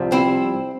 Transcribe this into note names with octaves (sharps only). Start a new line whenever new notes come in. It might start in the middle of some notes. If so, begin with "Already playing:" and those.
Already playing: C2 C3 F3
C4 E4